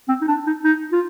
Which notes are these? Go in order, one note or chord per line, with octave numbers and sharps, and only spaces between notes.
C4
D#4
D4
D#4
D#4
F4